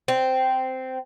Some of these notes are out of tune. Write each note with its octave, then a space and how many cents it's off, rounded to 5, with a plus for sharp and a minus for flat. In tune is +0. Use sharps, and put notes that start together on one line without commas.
C4 -10